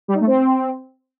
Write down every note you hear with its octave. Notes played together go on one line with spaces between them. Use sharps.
G3
D#4
A3
C4